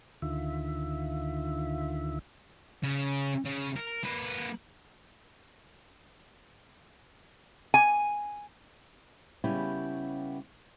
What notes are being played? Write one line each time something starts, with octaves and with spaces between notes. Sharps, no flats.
D2 D3 D#3 F4 E5
C#3
C#3
A#4
A#3 B4
G#5
C#3 G3 B3 C#4 E4 G4